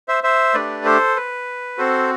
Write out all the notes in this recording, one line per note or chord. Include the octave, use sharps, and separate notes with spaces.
C5 E5
C5 E5
A3 D4 G4 B4 D5
A4 C5
B4
C4 F#4 A4 C5